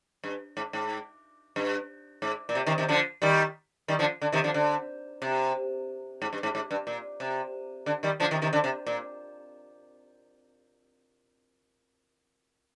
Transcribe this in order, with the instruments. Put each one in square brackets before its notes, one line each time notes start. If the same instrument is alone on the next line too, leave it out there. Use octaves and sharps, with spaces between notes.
[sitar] G2
G#2
G#2
G2
G#2
A#2
C3
C3 D#3
C3 D#3
D3 F3
D#3 G3
D#3 G3
D3 F3
D3
C3 D#3
D3 F3
D3
C3
G#2
G2
G#2
G#2
G2
A#2
C3
D3
D#3 G3
D3 F3
C3 D#3
C3 D#3
D3
C3
A#2